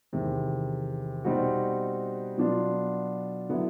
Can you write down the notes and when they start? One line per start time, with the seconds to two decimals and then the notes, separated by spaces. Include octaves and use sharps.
0.13 E2 C3 D#3
1.24 B2 G3 C4 D#4 F#4
2.37 B2 F#3 B3 D4 F4
3.49 D3 F#3 B3 E4